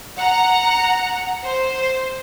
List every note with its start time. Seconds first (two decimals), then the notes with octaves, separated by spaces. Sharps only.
0.17 F#5 A#5
1.44 C5